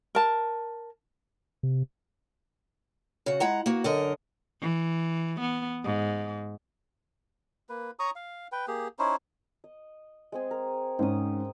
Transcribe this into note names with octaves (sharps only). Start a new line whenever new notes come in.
A#4 A5
C3
C#3 F#4
G#3 E4 F#5 A#5
A#3 B3 F#4
F#2 D3 A#4 D#5
E3
B3
G#2
A#3 B4
C#5 A#5 C#6 D#6
F5
B4 G5
A#3 G4 G#4
C#4 D#4 E4 C5
D#5
G#3 C4 G#4
A#4
G#2 C#4 C5 D#6